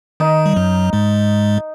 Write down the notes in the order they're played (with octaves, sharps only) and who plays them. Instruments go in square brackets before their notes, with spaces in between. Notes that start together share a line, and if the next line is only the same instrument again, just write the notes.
[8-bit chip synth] D#3 [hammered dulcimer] D#4
[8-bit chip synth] G3
F#2 F#3
G#2 G#3